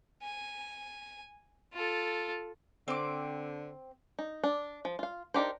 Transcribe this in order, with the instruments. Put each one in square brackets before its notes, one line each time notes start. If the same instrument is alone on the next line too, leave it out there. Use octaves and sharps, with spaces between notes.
[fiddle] G#5
F4 A4
[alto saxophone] D3 [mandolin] C4 D6
[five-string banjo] D#4
D4
F3
F4 F5
D4 D#4 G4 A#4 C5